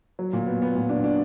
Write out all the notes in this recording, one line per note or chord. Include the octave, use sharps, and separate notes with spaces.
F#3
A#2
B3
B3
A#2
D4
D4